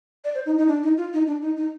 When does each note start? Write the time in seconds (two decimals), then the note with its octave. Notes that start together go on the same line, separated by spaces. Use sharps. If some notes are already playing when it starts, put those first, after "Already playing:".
0.24 D5
0.35 C5
0.46 D#4
0.58 D#4
0.68 D4
0.83 D#4
0.98 F4
1.13 D#4
1.27 D4
1.42 D#4
1.57 D#4